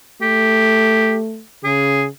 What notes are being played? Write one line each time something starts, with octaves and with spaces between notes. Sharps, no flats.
A3 G4
C#3 G#4